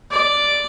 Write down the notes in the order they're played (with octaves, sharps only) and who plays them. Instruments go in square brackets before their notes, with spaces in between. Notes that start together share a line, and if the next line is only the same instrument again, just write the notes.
[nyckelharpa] D5